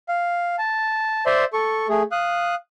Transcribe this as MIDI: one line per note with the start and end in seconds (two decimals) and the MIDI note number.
0.09 0.56 77
0.59 1.24 81
1.26 1.44 72
1.26 1.44 74
1.26 1.44 76
1.26 1.44 84
1.53 1.87 69
1.53 1.87 85
1.89 2.03 57
1.89 2.03 68
2.12 2.55 77
2.12 2.55 87
2.12 2.55 90